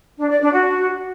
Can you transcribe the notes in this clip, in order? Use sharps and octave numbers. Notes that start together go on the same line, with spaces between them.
D4
D5
D4
F#4